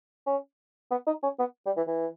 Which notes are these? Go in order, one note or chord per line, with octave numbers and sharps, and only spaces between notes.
C#4
B3
D#4
C#4
B3
G3
E3
E3